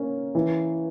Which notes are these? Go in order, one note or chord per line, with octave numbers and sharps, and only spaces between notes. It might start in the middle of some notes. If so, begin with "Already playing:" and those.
Already playing: A#3 C#4
E3